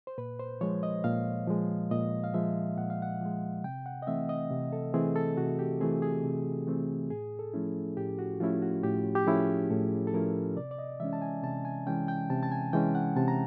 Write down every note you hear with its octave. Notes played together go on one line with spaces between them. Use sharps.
C5
A#2 B4
C5
F3 G#3 C#5
D#5
A#2 F5
F3 G#3
A#2 D#5
F5
F3 G#3 E5
A#2 F#5
F5
F#5
F3 G#3
C3 G5
F#5
D#5
E3 A3 C4 E5
D#5
C3
A4
E3 A3 C4 G#4
A4
C3 F#4
G4
E3 A3 C4 G#4
G#4
C3
E3 A3 C4
A2 G#4
A4
F3 A3 C#4 E4
A2 G4
F#4
F3 A3 C#4 E4 F4
F#4
A2 G4
G4
F3 A3 C#4 E4 G#4
A2 A4
A4
F3 A3 C#4 E4 A#4
C3 D5
D5
D#5
E3 G#3 C#4 E5
A5
G#5
C3 A5
G#5
E3 G#3 C#4 G5
G5
C3 A5
A5
G#5
E3 G#3 C#4 G5
F#5
C3 A5
A#5